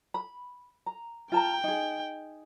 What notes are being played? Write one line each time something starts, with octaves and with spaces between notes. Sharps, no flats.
B5
A#5
F4 G5 A5 A#5
D#4 G#4